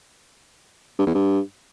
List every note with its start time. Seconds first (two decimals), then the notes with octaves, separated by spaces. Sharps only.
0.99 G2
1.07 E2
1.15 G2